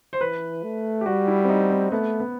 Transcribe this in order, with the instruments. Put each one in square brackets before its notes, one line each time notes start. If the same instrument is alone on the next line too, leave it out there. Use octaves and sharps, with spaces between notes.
[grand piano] C5
[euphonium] E3 [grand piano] B4
[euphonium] A3
[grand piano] G4
[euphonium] G3 [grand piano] F#4
[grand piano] E4
C4
D#4
C4
[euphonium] A3 [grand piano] B3
[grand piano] B3